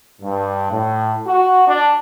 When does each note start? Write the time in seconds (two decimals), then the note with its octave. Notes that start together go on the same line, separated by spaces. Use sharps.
0.20 G2
0.70 A2
1.26 F#4
1.67 D4